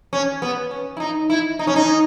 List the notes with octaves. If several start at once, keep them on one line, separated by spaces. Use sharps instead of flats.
C#4
B3
C#4
E4
D#4
E4
D#4
C#4
D#4